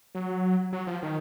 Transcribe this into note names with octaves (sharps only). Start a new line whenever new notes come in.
F#3
F#3
F3
D#3